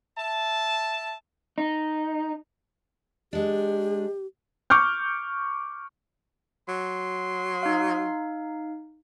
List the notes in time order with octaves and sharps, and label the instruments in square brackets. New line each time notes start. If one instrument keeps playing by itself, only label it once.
[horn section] E5 A5
[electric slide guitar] D#4
[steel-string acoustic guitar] G#3 D4 [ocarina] G4
[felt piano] C#6 D6 F6 G6
[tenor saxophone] F#3 [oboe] C6
[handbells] D#4 F5